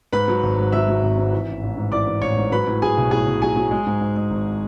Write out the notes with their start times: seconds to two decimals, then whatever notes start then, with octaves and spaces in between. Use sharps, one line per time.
0.13 G#2 B4 B5
0.28 F#3
0.43 G#1
0.58 G#2
0.72 F#3 E5 E6
0.88 F#3
1.03 G#1
1.18 G#2
1.32 E3
1.48 A1
1.63 A1
1.77 G#2
1.92 E3 D5 D6
2.07 E3
2.22 A1 C#5 C#6
2.36 G#2
2.51 F#3 B4 B5
2.67 A2
2.82 F#3 G#4 G#5
2.97 B1
3.11 A2 G#4 G#5
3.27 B1
3.42 F#3 G#4 G#5
3.56 F#3
3.71 G#3
3.86 G#2
4.01 G#2
4.16 G#3
4.31 G#1